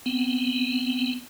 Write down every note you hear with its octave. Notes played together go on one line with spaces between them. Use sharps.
B3 C4